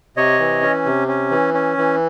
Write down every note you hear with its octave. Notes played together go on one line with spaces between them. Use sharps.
C3 C#5 D#5
E3
C#4
C3
C#4
E3
C#4
E3